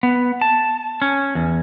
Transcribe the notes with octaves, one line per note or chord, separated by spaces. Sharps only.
B3
A5
C#4
E2